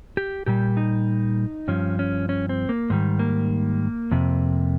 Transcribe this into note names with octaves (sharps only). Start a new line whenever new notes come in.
G4
A#2 G3 G4
D#4
G2 F3 C#4
C#4
C#4
C4
A#3
G#2 D#3 G3 G#3
A#3
F2 C3